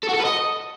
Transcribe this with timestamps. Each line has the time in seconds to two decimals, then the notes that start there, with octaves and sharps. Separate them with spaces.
0.03 A4
0.08 F#4
0.14 A4
0.20 B4
0.25 D#5